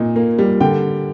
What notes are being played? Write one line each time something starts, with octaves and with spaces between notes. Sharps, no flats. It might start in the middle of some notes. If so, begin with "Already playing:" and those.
Already playing: A#2 D#4
A#3
G3
D3 G5